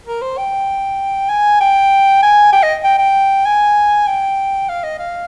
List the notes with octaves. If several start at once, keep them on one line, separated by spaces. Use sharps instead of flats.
A#4
C5
G5
G#5
G5
G#5
G5
D#5
G5
G5
G#5
G5
F5
D#5
F5